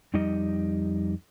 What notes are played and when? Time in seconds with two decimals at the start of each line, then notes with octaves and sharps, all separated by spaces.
0.14 F2 G3 D#4 G4 D#5